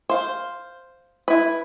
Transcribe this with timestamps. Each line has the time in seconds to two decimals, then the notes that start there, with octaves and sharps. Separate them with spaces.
0.09 C5 F5
1.28 E4 B4